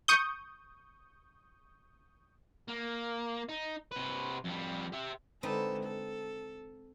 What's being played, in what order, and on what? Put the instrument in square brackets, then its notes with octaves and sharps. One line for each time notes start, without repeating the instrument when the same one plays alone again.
[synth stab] C#6 D#6 G6
[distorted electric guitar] A#3
D#4
C3 B4
F2 G3
G4 E5
[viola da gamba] D3 G#3 A4 [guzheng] C4 D#4 B4
[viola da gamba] A4